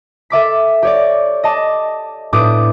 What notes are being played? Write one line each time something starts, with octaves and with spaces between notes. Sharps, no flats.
A4 E5 D6 B6
G4 C#5 D5
D#5 A5 D6
A2 B3 D4 G4 D6 D#6